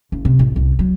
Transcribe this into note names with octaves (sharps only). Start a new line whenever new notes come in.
F#1
C3
A1
C2
F#3